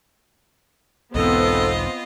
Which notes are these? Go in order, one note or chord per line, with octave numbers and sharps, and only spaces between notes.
B1 E2 G#2 B3 C4 F4 A4 D#5